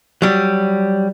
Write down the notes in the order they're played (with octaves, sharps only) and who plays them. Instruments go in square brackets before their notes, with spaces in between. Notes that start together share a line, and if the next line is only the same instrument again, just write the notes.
[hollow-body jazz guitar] F#3 G3